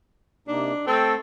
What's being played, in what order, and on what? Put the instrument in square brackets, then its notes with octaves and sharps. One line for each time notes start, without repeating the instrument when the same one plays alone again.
[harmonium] C3 A#3 D#4 [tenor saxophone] D4
[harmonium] A3 G5 [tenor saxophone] C4 [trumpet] A4